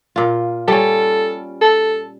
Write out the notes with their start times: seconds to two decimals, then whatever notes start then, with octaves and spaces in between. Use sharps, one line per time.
0.16 A#2 F4
0.68 G3 C#4 A4
1.62 A4